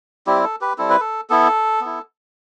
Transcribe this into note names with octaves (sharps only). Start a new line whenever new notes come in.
G3 C4 E4 G4
A4
G4 B4
G3 C4 E4 A4
B4
A4
B3 E4 A4
B3 E4